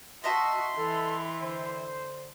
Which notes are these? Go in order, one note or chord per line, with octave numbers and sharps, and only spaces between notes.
F#4 D#5 E5 A5 C6
E3 A4
D3 C5